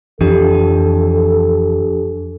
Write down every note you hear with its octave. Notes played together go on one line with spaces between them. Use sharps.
F2 E3 F3 D4 G4 A4